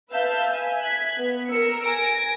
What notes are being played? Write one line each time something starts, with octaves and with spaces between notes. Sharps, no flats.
B4 E5 F5 A5 E6 G6
E5 G#5
F#6 G#6 B6
B3
A#4 E6 C#7
G#5 A#6 D7